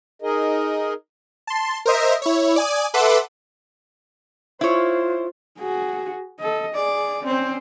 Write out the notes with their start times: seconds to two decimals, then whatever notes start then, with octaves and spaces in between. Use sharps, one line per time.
0.22 D#4 G#4 A#4 D#5
1.47 A5 C6
1.86 A#4 C5 D#5 E5
2.22 E4 C#5
2.56 D5 G#5 D#6
2.94 A4 B4 E5 F#5 C6 D6
4.61 E4 F4 C5 C#5
5.58 F#4 G#4
6.40 A4 D#5
6.75 G#4 D5
7.25 C4 C#4 C5